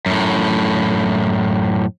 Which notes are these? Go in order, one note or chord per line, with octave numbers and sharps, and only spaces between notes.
F#2 A2